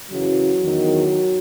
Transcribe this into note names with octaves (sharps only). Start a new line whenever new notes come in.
F#2 C#3 E3 F#3
E2 D#3